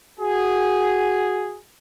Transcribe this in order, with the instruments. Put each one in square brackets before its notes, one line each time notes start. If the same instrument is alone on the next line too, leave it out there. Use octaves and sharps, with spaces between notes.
[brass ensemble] F#4 G#4